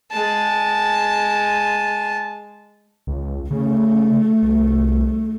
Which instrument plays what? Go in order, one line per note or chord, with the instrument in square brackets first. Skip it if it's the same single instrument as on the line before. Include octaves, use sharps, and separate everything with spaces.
[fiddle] G#3 A5
[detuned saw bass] C#2
[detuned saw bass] C#3 [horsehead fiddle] A3
[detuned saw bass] C2